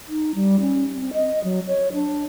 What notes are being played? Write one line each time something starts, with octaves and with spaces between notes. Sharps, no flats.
D#4
G3
C#4
C4
D#5
F#3
C#5
D4